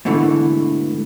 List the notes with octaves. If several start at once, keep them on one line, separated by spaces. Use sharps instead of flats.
G#2 B2 D3 E3 A3